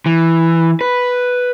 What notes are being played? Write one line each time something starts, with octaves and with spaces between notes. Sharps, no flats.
E3
B4